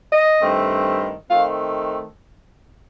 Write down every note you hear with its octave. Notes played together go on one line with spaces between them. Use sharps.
D#5
G2 D#3 A3 C4
D#3 A3 C4 F5